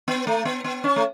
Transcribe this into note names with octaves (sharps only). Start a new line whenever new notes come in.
B3
A3
B3
B3
C#4
A3